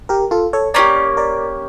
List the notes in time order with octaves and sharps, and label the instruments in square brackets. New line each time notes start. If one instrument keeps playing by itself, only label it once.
[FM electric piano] G4 A#4
F4 A4
A4 C#5
[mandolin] A#3 C#4 E4 G4 [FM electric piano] A#4 D5
[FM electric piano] A#4 D5